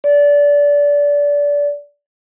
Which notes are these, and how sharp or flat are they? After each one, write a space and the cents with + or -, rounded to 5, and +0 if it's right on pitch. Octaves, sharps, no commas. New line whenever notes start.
D5 -25